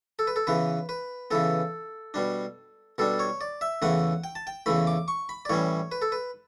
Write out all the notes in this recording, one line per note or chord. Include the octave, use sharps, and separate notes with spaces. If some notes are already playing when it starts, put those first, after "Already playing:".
A4
B4
A4
C#3 E3 B3 B4
B4
C#3 E3 B3 A4
B2 G3 D4
B2 G3 D4 A4
C#5
D5
E5
E2 C#3 E3 A3 F#5
G5
A5
G5
E2 C#3 E3 A3 B5
D6
C#6
B5
D5
A2 E3 G3 C#4 C#5
B4
A4
B4